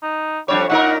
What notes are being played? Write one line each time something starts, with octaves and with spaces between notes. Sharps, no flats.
D#4
F2 G3 D4 C#5
A#2 D#4 A#4 F#5